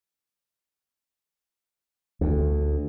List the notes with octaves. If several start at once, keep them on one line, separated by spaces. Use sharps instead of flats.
D2